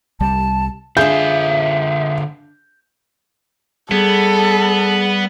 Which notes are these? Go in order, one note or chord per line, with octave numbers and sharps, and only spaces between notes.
C2 G3 A5
D3 D4 F4 G#4 E5 G6
G3 B3 G#4 A4